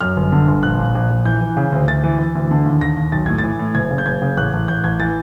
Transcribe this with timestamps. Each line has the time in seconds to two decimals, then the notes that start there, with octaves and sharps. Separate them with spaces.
0.01 F#2 F6
0.17 G1
0.32 D3
0.48 G1
0.63 A#1 F#6
0.78 A#1
0.95 A#1
1.10 A#1
1.25 E3 G6
1.41 E3
1.57 C#3
1.72 D2
1.87 D2 A6
2.04 E3
2.19 E3
2.35 D2
2.51 D3
2.66 D#2
2.81 D#2 A#6
2.97 D#2
3.12 B1 A6
3.26 A2 G#6
3.38 A6
3.44 E3
3.59 A2
3.75 F#1 G#6
3.91 C#3
3.98 G6
4.06 F#1 G#6
4.22 C#3
4.37 A1 F#6
4.53 A1
4.68 A1 G6
4.84 A1 G#6
4.99 E3 A6